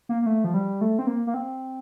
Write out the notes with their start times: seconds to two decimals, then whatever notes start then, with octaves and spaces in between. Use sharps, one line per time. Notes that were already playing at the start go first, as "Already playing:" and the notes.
0.09 A#3
0.22 A#3
0.26 A3
0.44 F3
0.54 G3
0.81 A3
0.99 C4
1.07 A#3
1.27 A#3
1.34 C4